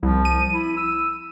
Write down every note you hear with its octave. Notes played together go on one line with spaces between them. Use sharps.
C2 F3
D#7
E4
E6